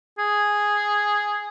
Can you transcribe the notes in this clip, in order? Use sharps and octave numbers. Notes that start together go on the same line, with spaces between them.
G#4